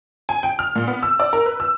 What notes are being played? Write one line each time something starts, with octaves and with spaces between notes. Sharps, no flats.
G#5
G5
F6
A#2
B3
E6
D5
A#4
B4
E6